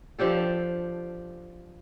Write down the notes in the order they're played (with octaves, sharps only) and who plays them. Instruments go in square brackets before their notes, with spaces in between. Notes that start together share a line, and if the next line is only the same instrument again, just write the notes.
[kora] F3 D4 G4 A4